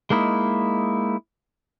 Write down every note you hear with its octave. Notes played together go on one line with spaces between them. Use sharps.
G#3 A#3 D#4 E4